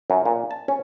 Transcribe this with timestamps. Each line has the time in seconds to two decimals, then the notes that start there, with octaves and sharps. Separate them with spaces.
0.10 F#2
0.26 A#2
0.51 A5
0.68 C#4